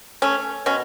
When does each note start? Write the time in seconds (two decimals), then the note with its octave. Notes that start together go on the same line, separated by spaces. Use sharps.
0.22 A3 C#4
0.66 B2 C#4